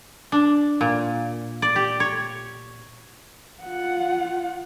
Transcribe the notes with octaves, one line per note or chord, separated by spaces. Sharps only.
D4
A#2
D5
G4
C#5
F4 F#5